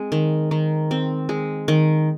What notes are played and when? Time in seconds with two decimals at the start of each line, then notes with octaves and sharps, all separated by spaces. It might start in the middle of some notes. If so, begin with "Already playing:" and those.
Already playing: G#3 C4
0.12 D#3
0.51 D#3
0.91 C4
1.29 G#3
1.68 D#3